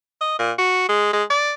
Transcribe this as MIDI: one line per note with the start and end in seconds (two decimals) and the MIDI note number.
0.21 0.38 75
0.39 0.52 46
0.59 0.88 66
0.89 1.09 56
1.13 1.24 56
1.30 1.52 74